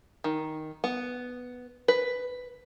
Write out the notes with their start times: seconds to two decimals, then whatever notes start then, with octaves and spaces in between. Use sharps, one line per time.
0.24 D#3
0.84 B3
1.88 B4